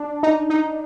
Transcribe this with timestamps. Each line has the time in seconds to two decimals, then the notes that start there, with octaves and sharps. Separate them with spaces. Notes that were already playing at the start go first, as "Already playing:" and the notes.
Already playing: D4
0.23 D#4
0.50 D#4